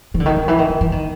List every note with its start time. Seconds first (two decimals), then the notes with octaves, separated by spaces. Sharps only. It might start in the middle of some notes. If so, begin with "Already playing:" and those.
0.14 E3
0.20 D3
0.26 D#3
0.36 D#3
0.48 E3
0.58 D#3
0.69 D#3
0.81 E3
0.92 D#3